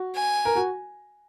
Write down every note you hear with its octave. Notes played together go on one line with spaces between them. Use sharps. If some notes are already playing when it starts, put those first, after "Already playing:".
Already playing: F#4
G#5
A#4
F#4